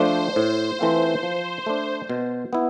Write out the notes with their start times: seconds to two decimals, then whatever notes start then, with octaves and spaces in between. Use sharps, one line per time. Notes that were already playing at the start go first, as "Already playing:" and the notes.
Already playing: F3 A3 D4 C5
0.36 A2
0.79 E3 A3 C4 F4
1.23 F3
1.66 A3 D4
2.09 B2
2.53 B3 E4